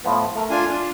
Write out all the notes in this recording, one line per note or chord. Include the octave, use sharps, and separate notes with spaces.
A2 F3 B3
A3 A#4
D4 F4 G#5
D4 F4